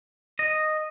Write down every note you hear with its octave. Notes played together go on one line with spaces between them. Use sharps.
D#5